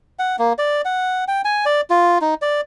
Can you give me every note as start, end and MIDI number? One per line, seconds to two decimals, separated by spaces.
0.19 0.36 78
0.39 0.53 58
0.58 0.82 74
0.85 1.24 78
1.28 1.41 79
1.45 1.65 80
1.66 1.81 74
1.90 2.18 65
2.21 2.34 63
2.42 2.61 74